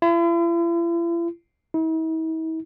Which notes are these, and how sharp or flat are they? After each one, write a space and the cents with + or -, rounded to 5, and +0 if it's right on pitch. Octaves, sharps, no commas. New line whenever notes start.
E4 +45
E4 -45